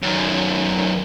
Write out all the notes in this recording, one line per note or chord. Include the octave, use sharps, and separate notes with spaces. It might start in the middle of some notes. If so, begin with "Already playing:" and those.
F#2 D#3